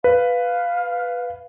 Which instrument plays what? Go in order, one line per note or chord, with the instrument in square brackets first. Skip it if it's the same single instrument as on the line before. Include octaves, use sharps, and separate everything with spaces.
[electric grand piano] B4 [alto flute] F5